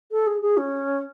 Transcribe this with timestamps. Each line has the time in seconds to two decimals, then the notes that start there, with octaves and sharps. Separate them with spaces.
0.11 A4
0.26 G#4
0.42 G#4
0.57 C#4